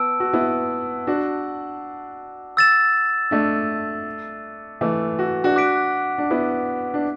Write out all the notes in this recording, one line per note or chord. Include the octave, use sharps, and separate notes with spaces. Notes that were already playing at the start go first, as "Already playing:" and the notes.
Already playing: B3 A5 E6 D7
F#4
B3 E4
D4 F#4
E6 A6 E7
A3 D4
E3 A3
F#4
D4 F#4
D6 F#6 B6 D7
D4
B3 E4
D4